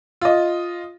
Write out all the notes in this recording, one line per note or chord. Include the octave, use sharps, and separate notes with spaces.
F4 D#5